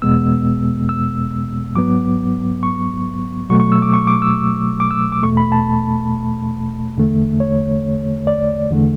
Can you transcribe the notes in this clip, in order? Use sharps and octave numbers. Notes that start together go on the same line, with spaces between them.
E2 B2 G#3 B3 E6
E6
G#2 F#3 B3 D6
C#6
B2 F#3 A3 C#6
C#6
E6
D6
C#6
D6
E6
D6
E6
D6
E2 B2 A3 C#6
B5
A5
E2 D3 A3
C#5
D5
E2 D3 A3